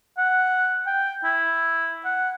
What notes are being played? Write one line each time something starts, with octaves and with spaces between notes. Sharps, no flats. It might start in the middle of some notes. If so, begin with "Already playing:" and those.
F#5
G5
E4
F#5